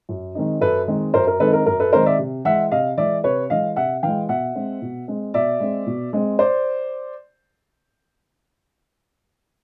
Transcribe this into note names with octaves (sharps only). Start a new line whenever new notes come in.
F#2
D#3 G#3 C4 D#4
F#2 A4 B4
D#3 G#3 C4 D#4
F#2 A#4 C5
A#4
D#3 G#3 C4 D#4 A4 B4
A#4
F#2 A#4
A4 B4
D#3 G#3 C4 D#4 A#4 C5
D5 E5
C3
E3 G#3 E5 F#5
C3 D#5 F5
E3 G#3 D5 E5
C3 B4 C#5
E3 G#3 D#5 F5
C3 E5 F#5
E3 G#3 F5 G5
B2 E5 F#5
G#3 C4
B2
G#3 C4
B2 D5 E5
G#3 C4
B2
G#3 C4
C5 D5